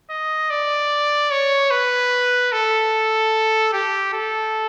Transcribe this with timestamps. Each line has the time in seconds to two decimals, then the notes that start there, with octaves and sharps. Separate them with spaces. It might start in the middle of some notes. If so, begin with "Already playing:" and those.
0.10 D#5
0.50 D5
1.31 C#5
1.71 B4
2.52 A4
3.73 G4
4.13 A4